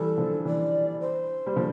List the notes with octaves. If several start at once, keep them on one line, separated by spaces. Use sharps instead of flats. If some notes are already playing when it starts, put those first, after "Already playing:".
Already playing: E3 G3 A4
D3 F3
E3 D5
C5
G3
D3 F3